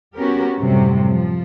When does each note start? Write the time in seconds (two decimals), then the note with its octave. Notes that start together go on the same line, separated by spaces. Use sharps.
0.15 B3 C#4 F#4 G4 A#4
0.58 F#2 A2 C3 F#3 G3
1.06 F3